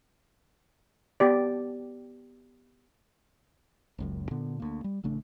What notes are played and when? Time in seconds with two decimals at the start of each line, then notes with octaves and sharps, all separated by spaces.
1.20 B3 G4 D5
3.98 F#1 C#2 F#2
4.31 A#2 D3 B3
4.60 D2 A#3
4.84 G3
5.04 A1 C#3 A3 D4